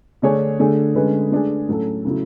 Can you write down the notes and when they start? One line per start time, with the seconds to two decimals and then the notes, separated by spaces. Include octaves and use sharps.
0.22 D3 A3 D4 G#4 C#5
0.59 D3 A3 D4 G#4
0.95 D3 G#3 C#4 G#4 B4
1.32 A3 D4 G#4
1.68 A2 F#3 C#4 F#4 A4
2.05 C#3 F#3 A3 E4